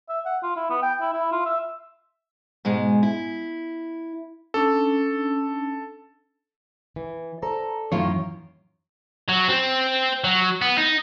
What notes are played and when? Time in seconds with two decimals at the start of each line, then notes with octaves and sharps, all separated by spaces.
0.09 E5
0.25 F#5
0.43 F4
0.56 E4
0.70 B3
0.83 G5
1.01 E4
1.13 E4
1.32 F4
1.45 E5
2.65 G#2 B2 G#3
3.03 E4
4.54 C#4 D4 A4
6.96 E3
7.42 A4 C5 D5 A#5
7.92 F#2 A2 D#3 E3 F4 C#5
9.28 F#3
9.48 C4
10.24 F#3
10.62 B3
10.78 D#4